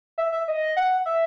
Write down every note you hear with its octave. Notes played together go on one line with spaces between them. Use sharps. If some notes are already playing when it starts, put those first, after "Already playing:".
E5
E5
D#5
F#5
E5